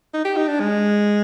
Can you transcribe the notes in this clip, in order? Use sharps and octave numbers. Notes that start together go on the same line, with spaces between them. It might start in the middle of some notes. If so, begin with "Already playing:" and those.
D#4
G4
D#4
D4
G#3